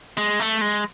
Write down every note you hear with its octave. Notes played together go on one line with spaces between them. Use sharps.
G#3
A3
G#3